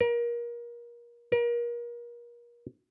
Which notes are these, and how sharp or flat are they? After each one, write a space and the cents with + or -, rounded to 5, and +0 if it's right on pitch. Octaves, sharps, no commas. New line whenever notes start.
A#4 +30
A#4 +35